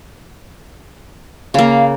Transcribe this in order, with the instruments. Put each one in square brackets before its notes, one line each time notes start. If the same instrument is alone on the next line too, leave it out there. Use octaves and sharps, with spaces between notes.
[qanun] C#3 A#3 [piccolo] F5